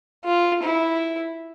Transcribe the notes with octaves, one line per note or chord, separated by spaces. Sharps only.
F4
E4